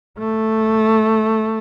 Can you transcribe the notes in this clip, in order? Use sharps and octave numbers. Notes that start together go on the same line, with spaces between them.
A3